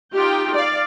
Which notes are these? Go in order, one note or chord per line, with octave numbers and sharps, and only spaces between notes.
D#4 F4 G4 G5
D5 F5